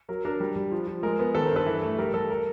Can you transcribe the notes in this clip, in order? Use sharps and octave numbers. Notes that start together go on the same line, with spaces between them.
F#3 A#4
D4 A#4
G3
G3
F3
F3
G#3 A#4
B3
D#3 A4 B4
A#4 C5
G2 A4 B4
E3
A3
G3 A#4
G3 A4
A#4